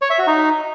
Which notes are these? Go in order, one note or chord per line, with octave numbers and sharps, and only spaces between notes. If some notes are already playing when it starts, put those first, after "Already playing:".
C#5
E5
F#4
D#4